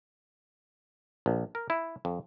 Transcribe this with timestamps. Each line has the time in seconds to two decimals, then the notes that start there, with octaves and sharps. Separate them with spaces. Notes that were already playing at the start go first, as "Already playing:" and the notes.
1.26 A#1
1.55 A#4
1.70 E4
2.05 F2